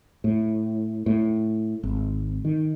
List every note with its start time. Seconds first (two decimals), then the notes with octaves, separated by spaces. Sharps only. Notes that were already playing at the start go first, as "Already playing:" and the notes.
0.24 A2
1.06 A2
1.83 G#1
2.45 D#3